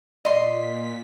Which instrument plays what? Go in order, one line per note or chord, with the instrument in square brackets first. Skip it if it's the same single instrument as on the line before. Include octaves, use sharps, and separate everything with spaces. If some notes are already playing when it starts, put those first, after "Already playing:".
[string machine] A#2 B6 [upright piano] D5 [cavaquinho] D#5 C6